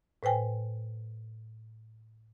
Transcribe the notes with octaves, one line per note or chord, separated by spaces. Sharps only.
A2 B4 C5 G5 G#5